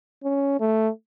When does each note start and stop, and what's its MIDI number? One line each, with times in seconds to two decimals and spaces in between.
0.24 0.58 61
0.60 0.89 57